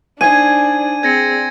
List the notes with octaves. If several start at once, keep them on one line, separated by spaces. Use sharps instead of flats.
D4 D#4 C5 D5 G#5 G#6 D#7
C4 G#4 D5 G#6 A#6 C#7